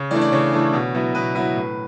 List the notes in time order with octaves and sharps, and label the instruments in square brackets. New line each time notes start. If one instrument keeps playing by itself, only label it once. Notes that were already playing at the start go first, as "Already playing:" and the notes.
Already playing: [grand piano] C#3
E3 A3 D4 D5
D5
C#3 C#5
E3 A3 D4
B2
F#3 B3 E4
B2 B4
F#3 B3 E4 B4
A2